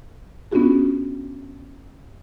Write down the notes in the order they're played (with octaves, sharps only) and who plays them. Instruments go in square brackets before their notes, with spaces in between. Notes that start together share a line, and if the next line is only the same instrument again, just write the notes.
[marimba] B3 C#4 D4 F4 F#4 G#4